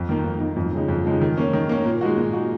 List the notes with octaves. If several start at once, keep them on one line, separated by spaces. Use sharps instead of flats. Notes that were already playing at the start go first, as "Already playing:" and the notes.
Already playing: F2
D#3 A#3 D#4
F2
D#3 A#3 D#4
F2
C#3 F3 G#3 D#4
F2
C#3 F3 G#3 D#4
D#3
A#3 C#4
D#3
A#3 C#4
A#2
G#3 D#4 F#4
A#2
G#3 D#4 F#4